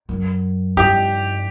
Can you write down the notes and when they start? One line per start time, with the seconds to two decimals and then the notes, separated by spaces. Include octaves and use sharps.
0.09 F#2
0.77 G2 G4